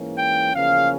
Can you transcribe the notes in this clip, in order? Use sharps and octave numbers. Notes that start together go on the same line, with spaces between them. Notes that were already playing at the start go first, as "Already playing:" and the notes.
Already playing: G#2 E3 A#3 C#4
G5
E2 C#3 F3 A#3 C#4 F5